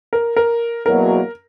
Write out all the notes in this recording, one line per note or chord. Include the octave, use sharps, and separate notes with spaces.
A#4
A#4
E2 B2 F#3 A#3 A#4